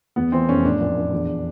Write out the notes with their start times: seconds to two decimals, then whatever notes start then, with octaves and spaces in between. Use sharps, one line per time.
0.16 E2 B3
0.32 E3 C4
0.48 F1 C#4
0.64 A2 D4
0.80 A#1
0.96 A#1
1.13 E2